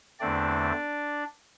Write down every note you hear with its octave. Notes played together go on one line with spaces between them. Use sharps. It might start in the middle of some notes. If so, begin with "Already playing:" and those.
E2 D3 A3 C4 D4 D5